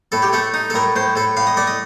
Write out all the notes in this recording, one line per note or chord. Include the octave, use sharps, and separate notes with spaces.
A2 A4
G4
A3 A4
D#4
A4
A2 A#4
A2 C5
A2 A4
A2 F5
D#5
A3 D5
D#5